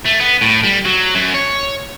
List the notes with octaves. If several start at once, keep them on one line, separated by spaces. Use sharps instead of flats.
A3
B3
A2
G3
F#3
F#2
C#5